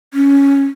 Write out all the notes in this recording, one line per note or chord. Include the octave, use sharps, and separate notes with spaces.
C#4